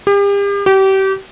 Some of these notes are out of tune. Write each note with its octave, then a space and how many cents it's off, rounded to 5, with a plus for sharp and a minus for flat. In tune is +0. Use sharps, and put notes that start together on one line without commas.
G4 +40
G4 -30